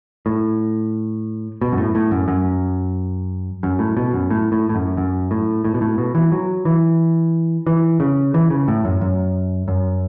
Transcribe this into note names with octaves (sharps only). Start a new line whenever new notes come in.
A2
B2
F#2
A2
A2
F#2
F#2
F#2
A2
B2
F#2
A2
A2
A2
F#2
F#2
A2
A2
B2
A2
B2
E3
F#3
E3
E3
C#3
E3
C#3
A2
F#2
F#2
F#2